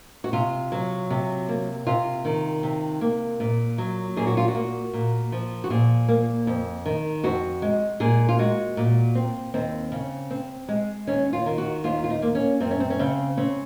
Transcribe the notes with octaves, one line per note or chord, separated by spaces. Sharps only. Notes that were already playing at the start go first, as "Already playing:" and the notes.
F#4
C3 F4
F#3
C3
A#3
C3 F4
D#3
C3
A#3
A#2
F#3
A#2 G#4
F#4
F4
F#4
A#3
A#2
F3
F#4
A#2 G#4
A#3
F2
D#3
F2 F#4
G#3
A#2 G#4
F4
G#3 F#4
A#2
C4
D#2 C4
C#3
C4
G#3
D#2 C#4
F4
D#3
F#4
D#2 F4
F4
D#4
A#3
C#4
F#2 C4
C#4
C4
C#4
C#3 C4
C4 C#4